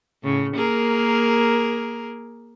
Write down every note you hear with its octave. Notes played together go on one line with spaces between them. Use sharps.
A2 C#3
A#3 G#4 A#4